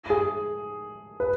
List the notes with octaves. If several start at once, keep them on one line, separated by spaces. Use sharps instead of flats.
G#4
B4